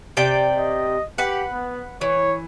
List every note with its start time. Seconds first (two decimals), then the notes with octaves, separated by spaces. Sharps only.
0.17 C3 D5 G5
0.57 D#5
1.18 G4 B4 F#5
1.51 B3
2.01 E3 C#5